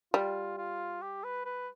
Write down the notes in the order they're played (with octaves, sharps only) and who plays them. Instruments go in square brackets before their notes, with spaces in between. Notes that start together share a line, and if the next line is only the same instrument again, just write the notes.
[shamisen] G3 [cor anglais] F4
[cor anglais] F4
G4
B4
B4